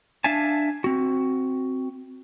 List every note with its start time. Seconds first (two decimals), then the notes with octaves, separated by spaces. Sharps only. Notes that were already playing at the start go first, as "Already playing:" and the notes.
0.24 D4 E5 F5 G#5 A5
0.84 C4 F#4